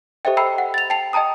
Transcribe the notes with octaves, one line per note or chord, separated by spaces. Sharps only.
G4 A4 C5 D#5 E5 G5
G5 A#5 B5 E6 C7
F#5
A6 F7
G5 A5 C7 F7
D#5 G5 A5 A#5 D#6